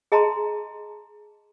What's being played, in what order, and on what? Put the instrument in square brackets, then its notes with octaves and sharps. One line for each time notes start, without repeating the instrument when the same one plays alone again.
[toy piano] G#4 D#5 A5 A#5 C6